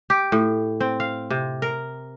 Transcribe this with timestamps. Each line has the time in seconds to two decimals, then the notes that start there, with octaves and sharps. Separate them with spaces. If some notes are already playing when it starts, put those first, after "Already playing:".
0.10 G4
0.32 A2
0.81 C4
1.00 F5
1.30 C3
1.62 A#4